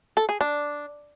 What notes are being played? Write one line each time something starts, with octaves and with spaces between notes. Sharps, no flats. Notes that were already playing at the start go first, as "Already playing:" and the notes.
A4
G#4
D4